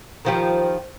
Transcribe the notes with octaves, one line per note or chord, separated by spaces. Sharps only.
D#3 F3 G3